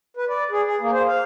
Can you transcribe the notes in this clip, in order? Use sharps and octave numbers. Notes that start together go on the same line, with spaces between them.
B4
D5
G#4
G#4
A#3
C5
F5